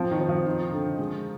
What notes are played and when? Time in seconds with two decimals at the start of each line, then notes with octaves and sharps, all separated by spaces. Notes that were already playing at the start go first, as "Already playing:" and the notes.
Already playing: F3 C4
0.11 D#3
0.19 C4
0.29 F3
0.46 D#4
0.72 D3
0.98 G#3